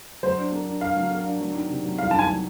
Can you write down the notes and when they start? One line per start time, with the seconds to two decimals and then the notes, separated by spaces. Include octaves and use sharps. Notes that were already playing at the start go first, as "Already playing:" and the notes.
0.23 F#3 C5
0.38 D4
0.52 A#3
0.67 D4
0.81 D4 F5
0.96 F#3
1.11 A#3
1.26 D4
1.41 F#3
1.55 D#3
1.70 C3
1.84 F#3
1.98 C2 F5
2.11 A5
2.14 D#3 G#5
2.28 F#3